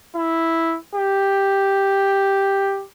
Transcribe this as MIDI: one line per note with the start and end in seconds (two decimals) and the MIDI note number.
0.16 0.77 64
0.95 2.84 67